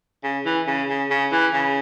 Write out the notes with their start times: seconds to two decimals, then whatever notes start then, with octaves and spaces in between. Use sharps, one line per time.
0.24 C#3
0.45 E3
0.67 C#3
0.89 C#3
1.10 C#3
1.32 E3
1.53 C#3